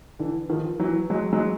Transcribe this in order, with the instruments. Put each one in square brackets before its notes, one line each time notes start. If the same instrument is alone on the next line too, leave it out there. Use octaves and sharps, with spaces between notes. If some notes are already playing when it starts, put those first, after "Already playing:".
[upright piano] D3 E3
D#3 F3
E3 F#3
F#3 G#3
F#3 G#3